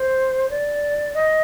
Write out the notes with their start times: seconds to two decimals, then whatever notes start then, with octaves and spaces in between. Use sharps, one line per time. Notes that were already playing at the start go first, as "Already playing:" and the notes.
Already playing: C5
0.50 D5
1.14 D#5